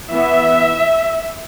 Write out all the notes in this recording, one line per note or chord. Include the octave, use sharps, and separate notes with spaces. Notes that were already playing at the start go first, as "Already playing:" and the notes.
E3 B3 E5